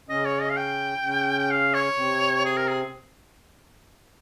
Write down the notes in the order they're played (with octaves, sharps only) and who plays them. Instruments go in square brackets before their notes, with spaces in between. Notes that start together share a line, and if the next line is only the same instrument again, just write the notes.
[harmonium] C#3 C#4 [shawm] D#5
[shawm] C#5
D#5
F5
G5
[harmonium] C#3 C#4
[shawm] G5
F5
C#5
[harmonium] C3 C4
[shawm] G#4
A#4
G#4